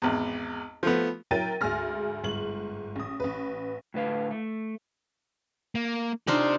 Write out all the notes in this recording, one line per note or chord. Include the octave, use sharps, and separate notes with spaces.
G#1 E2
F3 A3 B3
F#3 E4 A#4 G5 A6 D#7
D2 G#2 G#3 G#5 F6 A#6
G1 G#2 F#7
A1 D#6
A1 B4
A2 D3 B4 F5
A3
A#3
D4 D#4 F4 G4 C5